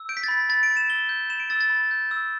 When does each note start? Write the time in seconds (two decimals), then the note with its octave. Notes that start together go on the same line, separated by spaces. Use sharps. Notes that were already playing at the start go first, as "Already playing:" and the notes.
Already playing: E6
0.09 G6 D7
0.17 B6
0.24 A6
0.28 B5 B6
0.49 B5 A6
0.63 D7
0.70 B5
0.77 E7
0.89 E6 G7
1.09 G6
1.30 B5 E7
1.40 D7
1.50 E6 A6
1.61 A6
1.70 B5
1.91 G6
2.11 E6